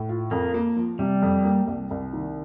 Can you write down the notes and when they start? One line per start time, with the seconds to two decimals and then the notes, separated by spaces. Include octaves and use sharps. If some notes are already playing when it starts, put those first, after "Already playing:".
Already playing: A2
0.09 F4
0.31 F2 A#3
0.54 A#3
0.76 F3
0.99 C3 G3
1.22 F2
1.44 A#3
1.67 C2
1.91 C2
2.13 D#3